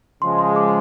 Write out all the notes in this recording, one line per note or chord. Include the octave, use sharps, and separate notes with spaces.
C#3 F3 G#3 C6
C6
D6